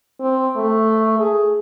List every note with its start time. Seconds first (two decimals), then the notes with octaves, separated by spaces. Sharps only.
0.20 C4
0.56 A3
1.19 G#4